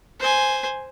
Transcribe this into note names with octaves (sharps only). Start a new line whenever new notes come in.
C5 G#5